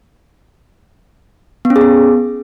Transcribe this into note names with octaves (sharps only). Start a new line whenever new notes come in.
B3
C#4
G#4
B3